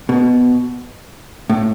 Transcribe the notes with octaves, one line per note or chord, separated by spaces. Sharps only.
B2
A2